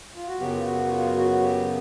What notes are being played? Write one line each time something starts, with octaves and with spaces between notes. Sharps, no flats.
F4
F#4
F#2 C#3 F#3 B3 G4
F4
F#4
F4
F#4
G4